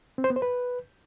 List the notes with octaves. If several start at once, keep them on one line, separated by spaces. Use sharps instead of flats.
C4
C5
B3
C5
B4